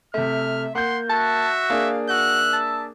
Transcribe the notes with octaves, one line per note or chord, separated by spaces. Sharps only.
C3 A3 E5 F6
A#3 F#5 C6 G6
F#4 E5 A5
A#3 D4 G#4 F5
F#4 E5 F#6
A5